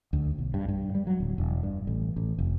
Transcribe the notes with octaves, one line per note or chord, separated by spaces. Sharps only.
D2
B1
G2
G2
G3
F#3
D1
E1
G2
A1
A1
F1